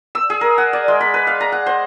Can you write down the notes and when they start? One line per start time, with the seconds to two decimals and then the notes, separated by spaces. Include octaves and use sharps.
0.15 E6
0.30 G#4
0.41 A#4
0.58 F#5
0.73 D5
0.88 G#3
1.01 B5
1.14 B4
1.27 F5
1.40 A#5
1.52 F#5
1.66 C5